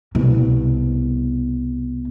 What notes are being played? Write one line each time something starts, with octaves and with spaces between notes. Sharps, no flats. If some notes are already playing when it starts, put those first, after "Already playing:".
C2 B2